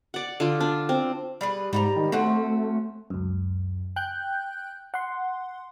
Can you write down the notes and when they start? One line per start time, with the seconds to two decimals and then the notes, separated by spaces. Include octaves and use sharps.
0.14 D5 F#5
0.40 D3 F4
0.60 D4
0.89 C4
1.41 G3 G#4 B4
1.73 G#2 G3 F#5 A#5
1.96 D#3
2.12 A3 C4 C#4 F#4
3.10 C#2 F#2
3.96 G5 F#6 G6
4.94 F#5 C6